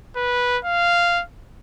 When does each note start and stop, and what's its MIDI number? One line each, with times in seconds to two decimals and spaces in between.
0.16 0.58 71
0.65 1.23 77